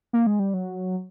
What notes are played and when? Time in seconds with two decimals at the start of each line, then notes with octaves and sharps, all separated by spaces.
0.13 A#3
0.27 G#3
0.39 G3
0.54 F#3